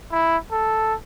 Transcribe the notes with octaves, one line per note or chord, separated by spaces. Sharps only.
E4
A4